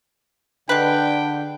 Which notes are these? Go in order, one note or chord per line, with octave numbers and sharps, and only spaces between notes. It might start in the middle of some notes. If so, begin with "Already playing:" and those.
D3 G#3 D4 B4 G5